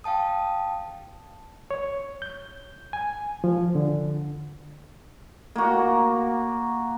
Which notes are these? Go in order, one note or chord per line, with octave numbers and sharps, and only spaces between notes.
F5 G5 A5 D#6
C#5
G6
G#5
F3
D3
A#3 F#4